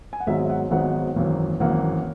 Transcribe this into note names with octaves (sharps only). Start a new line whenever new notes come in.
G#5
F#5
G#1 G#2 F#3 B3 D#4 E5
E5
F#5
G#1 G#2 F#3 B3 D#4 F#5
G#1 F#2 E3 A#3
G#1 F#2 E3 A#3 F#5